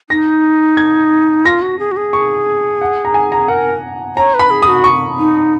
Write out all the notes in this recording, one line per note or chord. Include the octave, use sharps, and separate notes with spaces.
D#4 A#6
G#6
F4 A#6
F#4
G#4
F#4
G#4
C#6
F#5
A#5
G#5
A#5
A#4 F#5
C#5 A#5
B4
B5
G#4
D#6
F#4
C#6
D#4